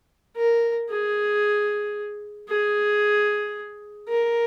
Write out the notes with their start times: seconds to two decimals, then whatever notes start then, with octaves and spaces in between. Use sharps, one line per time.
0.37 A#4
0.90 G#4
2.49 G#4
4.09 A#4